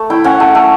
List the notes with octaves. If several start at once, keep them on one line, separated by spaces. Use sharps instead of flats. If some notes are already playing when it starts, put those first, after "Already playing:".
Already playing: A3
E4 G5
C#4 F#5
A3
A3